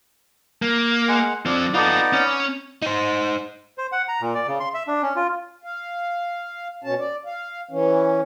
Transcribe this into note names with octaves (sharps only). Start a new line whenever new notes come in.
A#3
G#3 F#5
F3 C4 D4
B3 D#4 F4 A4 D5
C#4
D#4 C5
C5
F#5
A#5
A#2
D5
C#3
C6
E5
D4
C#4
F4
F5
B2 C#4 A5
D5
F5
E3 C#4